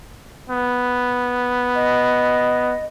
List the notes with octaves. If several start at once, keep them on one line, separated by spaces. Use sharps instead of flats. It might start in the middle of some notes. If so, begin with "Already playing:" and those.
B3
D#5